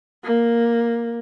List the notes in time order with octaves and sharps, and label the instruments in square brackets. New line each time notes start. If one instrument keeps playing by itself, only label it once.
[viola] A#3